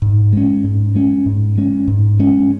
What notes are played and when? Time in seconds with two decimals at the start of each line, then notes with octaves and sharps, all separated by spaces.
0.02 G#2
0.33 G#3 C#4
0.64 G#2
0.95 G#3 C#4
1.26 G#2
1.57 G#3 C#4
1.88 G#2
2.19 G#3 C#4